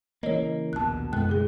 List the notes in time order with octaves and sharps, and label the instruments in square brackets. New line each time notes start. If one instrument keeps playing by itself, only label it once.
[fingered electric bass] C#3 E3 A#3 [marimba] C#5 D#5
[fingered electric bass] A#1 D#2 B2 [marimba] A5 F#6
[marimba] F#2 B2 F#6 [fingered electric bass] G#3 A3 B3
[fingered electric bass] B1 G#3 [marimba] C#3 G#4